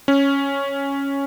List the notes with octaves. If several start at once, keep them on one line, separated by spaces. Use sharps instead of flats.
C#4